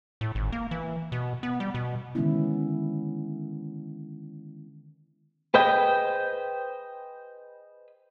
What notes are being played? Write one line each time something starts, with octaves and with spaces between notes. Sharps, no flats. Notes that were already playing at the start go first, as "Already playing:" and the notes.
A2
G#1
A#3
E3
B2
B3
G3
B2
D3 D#3 G#3 B3 C#4 E4
G#4 B4 C5 D#5 G5